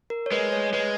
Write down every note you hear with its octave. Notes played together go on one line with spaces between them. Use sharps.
A#4
C#5
G#3 B4
C#5
G#3 B4